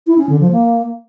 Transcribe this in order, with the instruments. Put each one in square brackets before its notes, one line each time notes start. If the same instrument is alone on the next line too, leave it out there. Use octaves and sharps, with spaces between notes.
[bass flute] E4
C#4
D3
F3
A#3